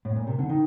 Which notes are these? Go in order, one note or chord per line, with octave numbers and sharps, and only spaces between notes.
A2
A#2
C3
D3
D#3